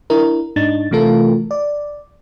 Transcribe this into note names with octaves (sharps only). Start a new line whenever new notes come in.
D4 E4 A#4
G#2 D4 D#4 A6
C3 E3 A3 F4 A4 A#4
D5